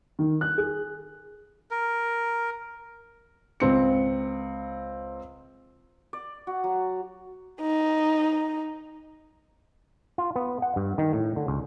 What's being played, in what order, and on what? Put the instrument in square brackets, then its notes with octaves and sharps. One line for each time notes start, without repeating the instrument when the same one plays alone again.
[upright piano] D#3
F#6
G#4
[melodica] A#4
[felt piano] C#2 C4 C#7
[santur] D5
F#4
F#3
[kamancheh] D#4
[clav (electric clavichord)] F4
B3
F#5
G2
D#3
A2
D3
C#2